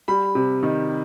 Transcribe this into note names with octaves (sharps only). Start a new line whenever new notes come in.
G3 B5
C3
D#3